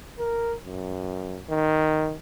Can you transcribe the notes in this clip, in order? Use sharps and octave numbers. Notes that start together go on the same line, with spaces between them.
A#4
F#2
D#3